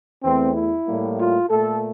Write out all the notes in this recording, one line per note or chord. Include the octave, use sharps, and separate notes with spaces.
E2 E3 A3 C4
E4
A2 G3 A#3
F4
A#2 A3 A4